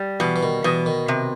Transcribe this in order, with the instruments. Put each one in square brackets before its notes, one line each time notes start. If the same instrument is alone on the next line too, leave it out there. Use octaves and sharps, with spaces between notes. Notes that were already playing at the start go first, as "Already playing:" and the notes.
Already playing: [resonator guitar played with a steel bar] G3
[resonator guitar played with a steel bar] B2 [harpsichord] E3
[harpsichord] E3
D#3
[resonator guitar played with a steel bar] B2 [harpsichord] E3
[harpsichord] D#3
[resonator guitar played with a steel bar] C3